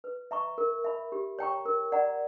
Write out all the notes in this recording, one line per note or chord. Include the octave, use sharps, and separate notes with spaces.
B4
E5 A#5 C#6
A#4
E5 B5
G4
C#5 G5 A#5 C#6
A#4
D5 F#5 A#5